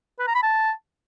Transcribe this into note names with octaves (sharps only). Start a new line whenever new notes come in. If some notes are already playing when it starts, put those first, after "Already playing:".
B4
A#5
B5
A5